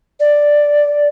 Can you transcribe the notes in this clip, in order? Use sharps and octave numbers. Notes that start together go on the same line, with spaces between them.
D5